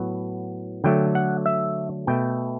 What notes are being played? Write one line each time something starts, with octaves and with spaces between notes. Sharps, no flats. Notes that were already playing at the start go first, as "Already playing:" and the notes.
Already playing: A2 F#3 B3
D3 F#3 A3 G5
F#5
E5
B2 A3 G5